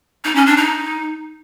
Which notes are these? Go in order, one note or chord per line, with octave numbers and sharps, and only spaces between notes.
D#4
C#4
D4
D#4